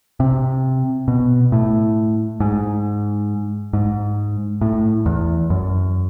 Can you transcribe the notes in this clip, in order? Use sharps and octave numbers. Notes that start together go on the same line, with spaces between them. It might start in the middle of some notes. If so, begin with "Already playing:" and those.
C3
B2
A2
G#2
G#2
A2
E2
F#2